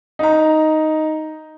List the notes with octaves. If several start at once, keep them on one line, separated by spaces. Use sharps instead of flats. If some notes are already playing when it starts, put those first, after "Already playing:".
D#4 A#5